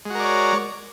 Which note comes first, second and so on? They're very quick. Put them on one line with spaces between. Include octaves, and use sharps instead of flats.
G#3 F#4 A#4 D5 C#5